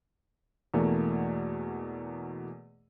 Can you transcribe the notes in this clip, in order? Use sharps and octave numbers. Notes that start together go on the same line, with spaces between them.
E2 B2 E3 A3 A#3